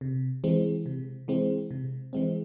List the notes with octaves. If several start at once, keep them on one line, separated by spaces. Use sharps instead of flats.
C3
E3 G#3 C4
C3
E3 G#3 C4
C3
E3 G#3 C4